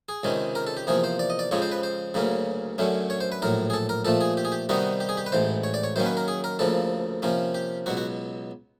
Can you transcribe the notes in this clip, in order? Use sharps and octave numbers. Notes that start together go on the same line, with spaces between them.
G#4
C#2 C3 D#3 G#3 C#4
A#4
A4
G4
E2 C3 F3 A#3 G#4
C5
D5
D#5
D5
F2 C#3 F3 G#3 C4 C#5
C5
B4
C5
D2 C#3 F#3 A#3 C#4
F#2 D3 F#3 A3 C#4
C#5
C5
B4
A#1 A2 F#3 A#4
G#4
A4
A#4
A#2 F3 A3 A4
G#4
G4
G#4
G4
C3 D#3 G3 B3 D#4 F#4
G4
G#4
G4
B4
A1 G#2 E3 C5
C#5
D5
C#5
F#2 D#3 F#3 A#3 C#4 C5
B4
A#4
G#4
A#4
D2 C#3 F3 A#3 A4
C3 F3 A#3 C#4
G4
C#2 B2 F#3 F#4
F#4